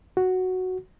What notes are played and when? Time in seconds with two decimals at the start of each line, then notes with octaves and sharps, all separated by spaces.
0.17 F#4